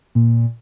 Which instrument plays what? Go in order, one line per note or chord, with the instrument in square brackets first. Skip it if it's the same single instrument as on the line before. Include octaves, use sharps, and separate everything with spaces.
[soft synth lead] A#2